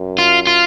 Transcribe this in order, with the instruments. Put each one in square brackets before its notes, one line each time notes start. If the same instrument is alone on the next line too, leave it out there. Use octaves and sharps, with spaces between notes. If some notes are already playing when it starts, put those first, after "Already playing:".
Already playing: [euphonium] F#2
[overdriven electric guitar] F4
F4